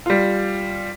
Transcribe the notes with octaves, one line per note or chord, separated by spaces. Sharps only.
G3 F4